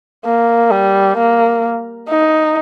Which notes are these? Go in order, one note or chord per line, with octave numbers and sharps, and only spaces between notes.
A#3
G3
A#3
D#4